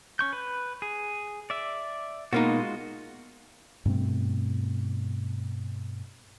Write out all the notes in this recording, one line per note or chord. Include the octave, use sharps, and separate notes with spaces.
C#4 C#6 G6
B4
G#4
D5 E5
B2 G#3 A#3 D#4 F4 F#4
G2 B2 A3 C4